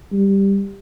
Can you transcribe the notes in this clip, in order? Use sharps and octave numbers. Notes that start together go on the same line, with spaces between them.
G3